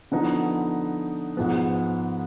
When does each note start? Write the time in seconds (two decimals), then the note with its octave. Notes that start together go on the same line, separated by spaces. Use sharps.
0.12 D3 F3 B3 D#4
1.37 G#2 F3 B3